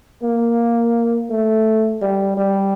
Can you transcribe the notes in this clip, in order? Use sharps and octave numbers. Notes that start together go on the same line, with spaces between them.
A#3
A3
G3
G3